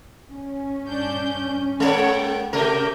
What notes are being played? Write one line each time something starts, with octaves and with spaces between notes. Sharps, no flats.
C#4
G2 D4 G6
G#3 A#3 A4 C#5 F#5 G5
C3 A3 G4 A#4 E5 G6